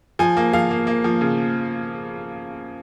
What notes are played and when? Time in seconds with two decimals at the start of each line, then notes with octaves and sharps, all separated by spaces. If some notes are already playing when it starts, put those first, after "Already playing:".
0.19 F3 G#5
0.37 A#3
0.53 F3 F5
0.71 A#3
0.87 A#3
1.04 F3
1.21 C#3